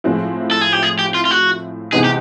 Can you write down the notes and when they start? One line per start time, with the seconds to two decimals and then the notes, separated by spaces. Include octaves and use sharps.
0.04 A2 F3 G#3 C4 E4
0.51 A4
0.61 G#4
0.73 G4
0.83 G#4
0.99 G4
1.14 F4
1.25 F4
1.31 F#4
1.92 C3 E3 G#3 B3 D#4 G#4
2.04 G4